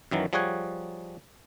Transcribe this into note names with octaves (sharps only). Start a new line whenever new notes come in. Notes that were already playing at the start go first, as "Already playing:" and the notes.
F#2 D#3 E3 F#3
F3 G3 G#4 C#5 F#5 G#5